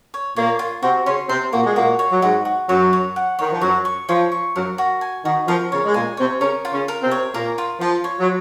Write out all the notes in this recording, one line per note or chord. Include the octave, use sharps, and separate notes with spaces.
C#5
A#2 A#3 C#5
F4
C3 C4 F#4
C#3 C#4 C6
C3 C4 C6
A#2 A#3 F#4
G#3
A#2 A#3 F#4
C#5
F#3
G#2 G#3 F#4
F#4
F#2 F#3 C#5
C#5
F#5
D#3 C#5
F3
F#2 F#3 C#5
C#6
F3 C#5
C#6
F#2 F#3 A#4
F#4
G#5
D#3 F#4
F3 A#4
C#3 C#4 C#5
G#3
A#2 A#3 G#5
C3 C4 C#5
C#3 C#4 A#4
F4
C#3 C#4
A#4
C3 C4
C#5
A#2 A#3 A#4
F4
F3 F4
C#5
F#3